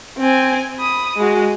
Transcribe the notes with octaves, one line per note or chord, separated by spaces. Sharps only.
C4 G#5
B5 D#6
G#3 F#4